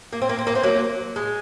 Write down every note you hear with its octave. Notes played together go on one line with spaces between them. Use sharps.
A#3
C4
A#3
C4
A#3
C4
F#3 A#3
G#3